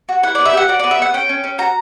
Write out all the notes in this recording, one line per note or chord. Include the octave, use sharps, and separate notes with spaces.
F#4
E4 F#5
B3 D5
E5
G4 F#5
F#4 D5
B3 D5
E5
B3 F#5
C#4 G5
C#4
C#4
F#4 A#5